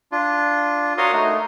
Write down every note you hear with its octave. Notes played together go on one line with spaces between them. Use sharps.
D4 F4
F#4 A#4 C#5 F5 C6 D#6
A3 D#4